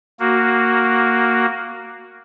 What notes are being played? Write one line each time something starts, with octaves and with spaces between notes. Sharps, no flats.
A#3 F#4